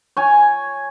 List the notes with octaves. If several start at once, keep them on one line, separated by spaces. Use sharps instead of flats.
C#5 G#5